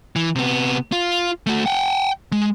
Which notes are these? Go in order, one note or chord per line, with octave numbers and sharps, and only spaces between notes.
E3
C3 B3
F4
A3 F#4
F#5 G5
G#3